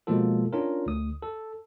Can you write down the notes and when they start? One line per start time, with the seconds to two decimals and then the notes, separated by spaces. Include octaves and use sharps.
0.07 B2 F3 G#3 A#3 F4 A4
0.53 C#4 D4 F4 A#4
0.86 D2 D#6
1.22 A4